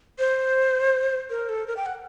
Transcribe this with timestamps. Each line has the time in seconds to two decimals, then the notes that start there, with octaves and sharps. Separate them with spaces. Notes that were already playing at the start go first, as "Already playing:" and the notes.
0.19 C5
1.30 A#4
1.49 A4
1.68 A#4
1.77 G5
1.86 F#5